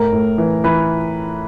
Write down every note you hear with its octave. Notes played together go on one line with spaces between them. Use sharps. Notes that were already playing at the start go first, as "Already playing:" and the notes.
Already playing: A2 A#4
A2
E3
E3 B4